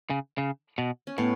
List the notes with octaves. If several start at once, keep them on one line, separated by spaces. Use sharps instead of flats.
C#3
C#3
B2
C#4
A2 B3